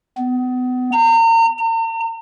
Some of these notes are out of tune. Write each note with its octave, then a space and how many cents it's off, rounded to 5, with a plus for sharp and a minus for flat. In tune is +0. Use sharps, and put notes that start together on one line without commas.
B3 +30
A#5 -35
A#5 -45